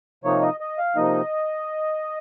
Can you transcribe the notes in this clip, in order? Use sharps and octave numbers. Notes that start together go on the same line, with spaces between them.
C3 F3 A#3 D#4 C#5
D#5
D#5
F5
C3 F3 A#3 D#4 D#5